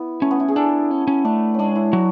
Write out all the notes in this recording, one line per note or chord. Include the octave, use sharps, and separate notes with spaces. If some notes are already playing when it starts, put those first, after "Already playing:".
Already playing: B3 E4
A3 C#4
B3
E4
G#4
D4 A4
C#4
C#4
A3 D4
G#3 C#4 D4
E4
F#3 F#4